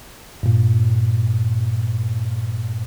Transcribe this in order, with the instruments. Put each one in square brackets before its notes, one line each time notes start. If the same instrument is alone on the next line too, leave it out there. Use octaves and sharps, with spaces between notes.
[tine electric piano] G2 A#2